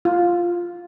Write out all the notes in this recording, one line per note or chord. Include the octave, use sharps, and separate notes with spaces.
F4